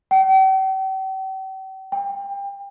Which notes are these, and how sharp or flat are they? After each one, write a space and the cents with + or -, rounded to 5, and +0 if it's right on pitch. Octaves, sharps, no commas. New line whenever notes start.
G5 -45
G5 +30